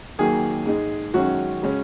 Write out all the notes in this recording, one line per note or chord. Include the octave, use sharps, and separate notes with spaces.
D#2 D#3 F#3 A#3 G#4
G#2 G#3 D#4
F#2 D#3 G#3 C#4 F#4
C#3 G#3 C#4